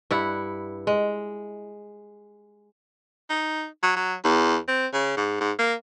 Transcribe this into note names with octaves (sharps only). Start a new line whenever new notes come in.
G2 E4 F#5
G#3
D#4
F#3
F#3
E2
C4
C#3
G#2
G#2
A#3